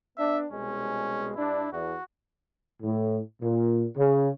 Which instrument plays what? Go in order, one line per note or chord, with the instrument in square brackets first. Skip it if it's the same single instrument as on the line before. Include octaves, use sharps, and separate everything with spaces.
[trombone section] B3 D4 [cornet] E5
[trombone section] C2 B2 G#3 [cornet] C#4
[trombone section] G2 D4 [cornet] E4
[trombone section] E2 [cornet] F#4
[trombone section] A2
A#2
C#3